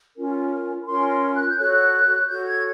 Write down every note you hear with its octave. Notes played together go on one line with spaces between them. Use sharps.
C#4 F4 A#4
B5
C#4 F4 A#4 C6
C6
F#6
G6
F#4 A4 C#5 F#6
F#4 A4 C#5 G6
G#6